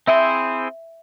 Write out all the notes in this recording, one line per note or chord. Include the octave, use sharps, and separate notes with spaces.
C4 E4 G#4 C5 E5